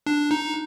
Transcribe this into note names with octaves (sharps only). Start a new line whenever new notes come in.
D4
D#4